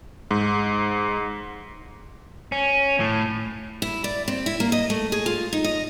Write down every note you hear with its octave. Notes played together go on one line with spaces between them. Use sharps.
G#2
C#4
A2
E4
D5
C4
E4
A#3
D#5
A3
G#4
F4
D#4
D#5